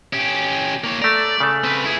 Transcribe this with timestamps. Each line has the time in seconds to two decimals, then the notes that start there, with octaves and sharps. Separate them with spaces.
0.13 C#4 G4
0.84 A#3 C#5
1.02 A3 D5 A#5
1.40 C#3 A3
1.64 C4 B4
1.85 E4 G#4